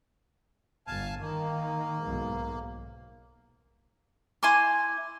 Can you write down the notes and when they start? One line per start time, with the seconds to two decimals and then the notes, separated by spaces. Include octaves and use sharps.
0.87 G1 F5 G#5 A5
1.20 D#3 A#3
2.02 B1 G#2
4.43 E4 G#5 C6 D6